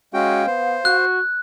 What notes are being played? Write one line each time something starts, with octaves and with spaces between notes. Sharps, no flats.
G#3 C#4 F#4 F5 G5
B3 C5
F#4 F#6